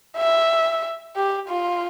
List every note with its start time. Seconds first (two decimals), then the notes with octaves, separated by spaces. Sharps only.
0.17 E5
1.16 G4
1.49 F4